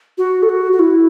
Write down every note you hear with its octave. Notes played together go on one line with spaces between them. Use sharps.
F#4
A4
F#4
F#4
E4